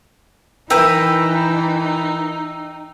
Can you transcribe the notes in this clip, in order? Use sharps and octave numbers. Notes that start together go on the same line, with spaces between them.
E3 D#4 A#4 B4 E5 G5 A#5